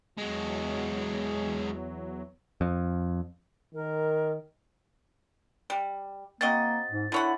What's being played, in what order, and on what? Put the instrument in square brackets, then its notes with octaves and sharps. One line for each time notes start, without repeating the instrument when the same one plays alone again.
[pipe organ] E2 F#3 [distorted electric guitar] G#3 F#4
[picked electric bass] F2
[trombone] D#3 [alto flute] A#4
[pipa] G3
[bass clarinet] A#3 [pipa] C4 F#4 D#5 [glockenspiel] A6
[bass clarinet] G#2
[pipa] D3 C#5 F#5 [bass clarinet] E4